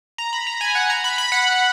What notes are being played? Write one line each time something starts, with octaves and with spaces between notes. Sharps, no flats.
A#5
B5
A#5
G#5
F#5
A#5
B5
B5
F#5